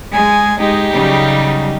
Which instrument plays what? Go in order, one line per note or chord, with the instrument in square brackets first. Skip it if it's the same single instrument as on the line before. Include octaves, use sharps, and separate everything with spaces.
[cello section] G#3 [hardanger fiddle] G#5
[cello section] G#3 [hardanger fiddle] D#4 G4
[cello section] C#3 F#3 G3